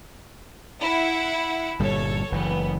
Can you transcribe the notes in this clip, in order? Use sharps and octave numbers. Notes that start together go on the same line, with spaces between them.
E4 F#5
G1 A#2 G3 A4 C#5
F#1 E3 B3